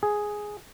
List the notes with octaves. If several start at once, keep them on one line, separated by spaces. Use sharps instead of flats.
G#4